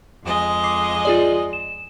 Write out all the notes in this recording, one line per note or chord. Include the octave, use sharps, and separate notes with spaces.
F2 G#3 D#5
D6 C7
F4 G#4 D5
E7